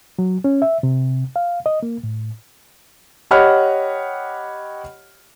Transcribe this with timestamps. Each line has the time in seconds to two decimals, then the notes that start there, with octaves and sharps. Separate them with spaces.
0.19 F#3
0.44 C#4
0.62 E5
0.83 C3
1.36 F5
1.66 D#5
1.83 A#3
2.03 A2
3.31 G4 C#5 D#5 F#5 B5 F6